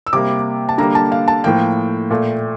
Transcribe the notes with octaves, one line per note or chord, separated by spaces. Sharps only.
E6
C3 G3 A#3 D6
A5
D3 G3 A#3 A#5
A5
F5
A5
A2 F3 A#3 G5
A#2 A3